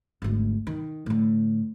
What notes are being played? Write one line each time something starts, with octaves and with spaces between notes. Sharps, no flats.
G#1 D2
D#3
A2 D3